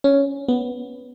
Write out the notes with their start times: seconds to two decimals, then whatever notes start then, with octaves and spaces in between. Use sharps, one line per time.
0.04 C#4
0.48 B3